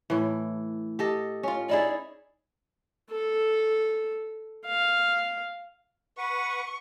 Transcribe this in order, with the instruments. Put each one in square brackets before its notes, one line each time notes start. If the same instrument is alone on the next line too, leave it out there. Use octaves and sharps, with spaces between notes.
[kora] A2 E3
G4 A4 D#5
C#4 F4
[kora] D#4 E4 G#4 [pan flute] D5
[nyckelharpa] A4
F5
[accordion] B4 F#5 [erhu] C#6